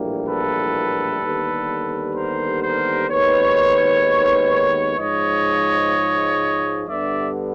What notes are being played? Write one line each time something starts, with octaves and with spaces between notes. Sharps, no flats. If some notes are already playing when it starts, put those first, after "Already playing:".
Already playing: A#1 A2 E3 G3 A#3
A4 B4
D#2 D3 G3 B3
A#4 C5
A#4 C5
D#2 D#3 G#3 B3 B4 C#5
G#2 F3 G#3 C#5 D#5
G2 D3 G3 B3 D5 E5